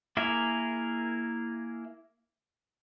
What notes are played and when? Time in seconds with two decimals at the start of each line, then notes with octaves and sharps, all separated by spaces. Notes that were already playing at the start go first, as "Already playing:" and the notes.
0.17 A#3 E4 G#4 A#4 E5